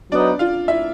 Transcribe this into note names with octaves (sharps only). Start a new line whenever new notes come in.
F#3 B3 D4 D#4 D5
F4 F5
E4 E5